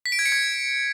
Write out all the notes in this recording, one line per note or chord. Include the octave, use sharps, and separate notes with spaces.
B6
D7
G#6
C#7
G#6